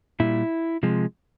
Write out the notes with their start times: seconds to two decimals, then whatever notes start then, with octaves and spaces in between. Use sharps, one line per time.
0.20 A#2 G3 E4
0.83 C3 F3 G#3